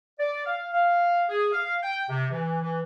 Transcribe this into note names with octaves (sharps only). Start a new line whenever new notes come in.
D5
F5
F5
G#4
F5
G5
C3
E3
E3